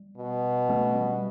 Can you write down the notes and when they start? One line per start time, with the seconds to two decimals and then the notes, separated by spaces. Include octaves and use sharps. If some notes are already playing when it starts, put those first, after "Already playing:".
Already playing: G3
0.17 B2
0.69 A3 C#4
0.95 G3 B3